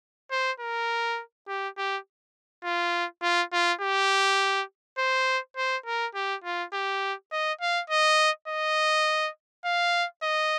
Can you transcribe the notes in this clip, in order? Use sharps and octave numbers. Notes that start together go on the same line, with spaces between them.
C5
A#4
G4
G4
F4
F4
F4
G4
C5
C5
A#4
G4
F4
G4
D#5
F5
D#5
D#5
F5
D#5